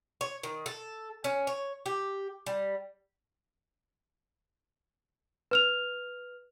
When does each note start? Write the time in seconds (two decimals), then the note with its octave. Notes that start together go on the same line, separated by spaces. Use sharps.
0.21 C#5
0.43 D#3
0.66 A4
1.24 C#4
1.47 C#5
1.86 G4
2.46 G3
5.51 B4 F6 F7